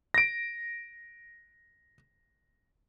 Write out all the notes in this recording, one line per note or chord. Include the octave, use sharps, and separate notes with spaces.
A#6 D7